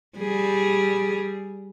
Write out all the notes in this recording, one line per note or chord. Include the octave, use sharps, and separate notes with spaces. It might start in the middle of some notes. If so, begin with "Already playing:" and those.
G3 G#4